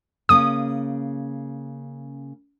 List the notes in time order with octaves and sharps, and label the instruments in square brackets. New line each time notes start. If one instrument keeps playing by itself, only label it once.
[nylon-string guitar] C#3 A#3 C#4 [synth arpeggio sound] D#6